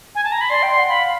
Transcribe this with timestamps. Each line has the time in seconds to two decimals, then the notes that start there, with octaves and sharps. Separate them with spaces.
0.15 G#5
0.24 A5
0.32 A#5
0.41 B5
0.50 D5 C6
0.63 G5
0.70 C6
0.76 F#5
0.89 F5 B5